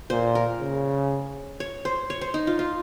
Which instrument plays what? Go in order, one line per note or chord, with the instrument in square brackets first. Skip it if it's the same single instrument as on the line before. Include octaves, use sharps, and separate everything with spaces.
[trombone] A#2 [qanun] C5
[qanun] A#4
[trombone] C#3
[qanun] C#5
C5
C#5
C5
D#4
F4
F4